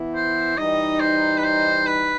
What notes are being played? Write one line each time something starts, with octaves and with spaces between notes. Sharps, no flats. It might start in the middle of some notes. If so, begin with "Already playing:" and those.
Already playing: E3 B3 E4
C5
E3 G3 D#4 D#5
C5
B4
C5
B4